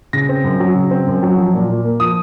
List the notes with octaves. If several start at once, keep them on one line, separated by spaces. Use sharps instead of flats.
C#3 A#6
C4
F#2
F#3
C#3
C4
F#2
F#3
F3
A#2
A#2
A#3
F3 D#6